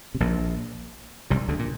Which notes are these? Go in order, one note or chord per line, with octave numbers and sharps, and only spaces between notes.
C3
A#1 A#2
C2 C3
D2 D3
A#2